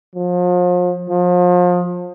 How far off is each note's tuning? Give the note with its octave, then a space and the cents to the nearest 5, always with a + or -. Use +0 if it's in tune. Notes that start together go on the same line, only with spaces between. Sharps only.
F3 +40
F3 +35